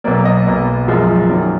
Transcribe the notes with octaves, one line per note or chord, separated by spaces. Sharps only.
B1 B2 F#3 A#3 D5
D#5
B1 B2 A#3
F#1 F#2 F3 G#3
F#2 D#3 F#3 A#3 D5